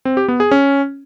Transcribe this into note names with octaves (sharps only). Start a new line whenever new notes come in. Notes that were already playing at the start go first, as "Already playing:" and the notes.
C4
G4
B3
G#4
C#4